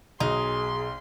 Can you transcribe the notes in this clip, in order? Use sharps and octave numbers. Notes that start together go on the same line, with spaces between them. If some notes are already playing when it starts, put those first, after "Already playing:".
B1 D#4 G#4 C6